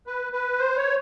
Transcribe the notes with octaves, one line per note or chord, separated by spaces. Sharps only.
B4
B4
C5
C#5